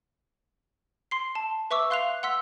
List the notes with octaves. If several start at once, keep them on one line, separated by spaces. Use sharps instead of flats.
C6 C7
A5
B4 E5 C#6 D6 E6
F5 C6 F#6 C7 F7
F#5 C6 E6 B6